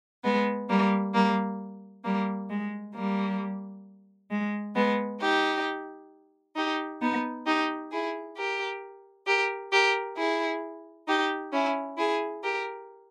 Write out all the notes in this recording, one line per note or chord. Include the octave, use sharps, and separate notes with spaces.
G#3 B3
G3 A#3
G3 A#3
G3 A#3
G#3
G3 A#3
G#3
G#3 B3
D#4 G4
D#4 G4
B3 D#4
D#4 G4
E4 G#4
G4 A#4
G4 A#4
G4 A#4
E4 G#4
D#4 G4
C#4 E4
E4 G#4
G4 A#4